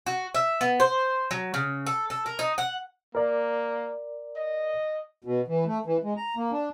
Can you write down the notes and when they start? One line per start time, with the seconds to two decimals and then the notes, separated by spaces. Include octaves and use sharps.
0.06 F#4
0.35 E5
0.61 B3
0.80 C5
1.31 F#3
1.54 C#3
1.86 A4
2.10 A4
2.26 A#4
2.39 D#4
2.58 F#5
3.15 A#3 A#4 D5
4.36 D#5
5.24 B2
5.47 E3
5.66 A3
5.86 E3
6.04 G#3
6.17 A#5
6.37 A#3
6.51 D4